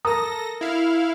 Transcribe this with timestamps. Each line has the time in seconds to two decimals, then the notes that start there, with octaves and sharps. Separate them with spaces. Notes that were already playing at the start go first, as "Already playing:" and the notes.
0.05 A4 A#4 A#5 D#6 A#6
0.61 E4 F5